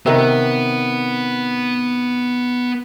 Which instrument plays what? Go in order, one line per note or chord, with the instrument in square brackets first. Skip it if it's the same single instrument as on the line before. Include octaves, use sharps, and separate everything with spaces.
[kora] C3 D#3 [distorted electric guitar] B3